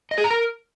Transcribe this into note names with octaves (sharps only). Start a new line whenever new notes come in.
D#5
G#4
A#5
A#4